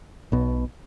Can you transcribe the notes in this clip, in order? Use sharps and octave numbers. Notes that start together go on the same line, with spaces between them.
B1 B2